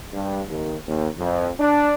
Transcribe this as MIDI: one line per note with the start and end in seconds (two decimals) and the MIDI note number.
0.13 0.42 43
0.48 0.74 39
0.87 1.08 39
1.18 1.50 41
1.59 1.94 62